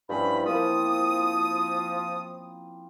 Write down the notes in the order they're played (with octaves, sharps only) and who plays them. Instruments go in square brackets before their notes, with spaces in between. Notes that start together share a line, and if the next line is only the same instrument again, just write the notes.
[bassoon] G2 [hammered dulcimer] F3 C#4 E4 [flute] B5
[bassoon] F3 [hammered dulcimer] A#3 C4 [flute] D#6